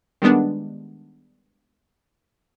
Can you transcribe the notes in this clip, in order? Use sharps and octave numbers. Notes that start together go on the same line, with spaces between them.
D#3 G3 G#3 B3 D4